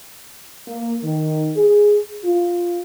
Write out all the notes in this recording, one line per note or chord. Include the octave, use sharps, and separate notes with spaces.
A#3
D#3
G#4
F4